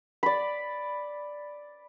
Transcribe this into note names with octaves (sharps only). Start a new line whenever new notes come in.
D5 B5